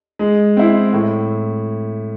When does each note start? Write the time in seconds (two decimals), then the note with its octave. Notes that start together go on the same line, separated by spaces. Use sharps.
0.19 G#3
0.57 C4 E4
0.93 A2